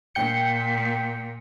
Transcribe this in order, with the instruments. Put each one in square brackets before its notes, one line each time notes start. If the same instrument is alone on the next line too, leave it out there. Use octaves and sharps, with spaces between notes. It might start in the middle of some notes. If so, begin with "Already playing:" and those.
[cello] A#2 [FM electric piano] G5 G6 C#7